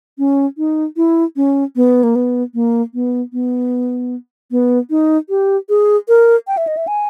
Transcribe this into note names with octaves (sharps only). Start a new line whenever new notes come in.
C#4
D#4
E4
C#4
B3
A#3
B3
A#3
B3
B3
B3
D#4
G4
G#4
A#4
G5
E5
D#5
E5
G#5